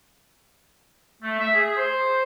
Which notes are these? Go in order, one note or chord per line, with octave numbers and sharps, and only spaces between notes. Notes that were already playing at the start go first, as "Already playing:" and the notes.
A3
E5
G#4
C5